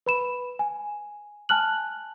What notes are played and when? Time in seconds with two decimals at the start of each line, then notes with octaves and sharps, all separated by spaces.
0.06 B4 B5 E7
0.59 G#5
1.49 G#5 A5 F6 F#6 F#7